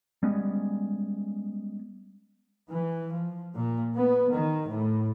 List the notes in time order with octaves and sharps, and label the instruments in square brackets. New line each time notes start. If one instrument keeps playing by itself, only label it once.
[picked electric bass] G3 G#3 B3 C#4
[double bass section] E3
F3
A#2
B3
D#3
A2